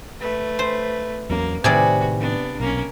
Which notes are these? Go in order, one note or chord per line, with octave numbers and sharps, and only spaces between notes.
A3 B4
C5
E2 F#3 A#3 C#4
A2 C3 D#3 F#4 G#4 B4 D5
B3 D4
B1 A#3 C#4